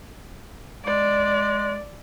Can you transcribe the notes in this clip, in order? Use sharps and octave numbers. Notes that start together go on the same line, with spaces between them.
G#3 D5